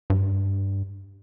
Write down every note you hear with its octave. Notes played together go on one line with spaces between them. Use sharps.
G2